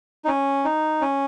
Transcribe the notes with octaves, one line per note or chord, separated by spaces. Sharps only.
D#4
C#4
D#4
C#4